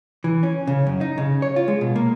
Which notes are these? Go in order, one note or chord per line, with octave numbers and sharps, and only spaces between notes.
E3
C#4
C#3
F#2
D#4
C#3
C#5
F4
G#3
B2
A#3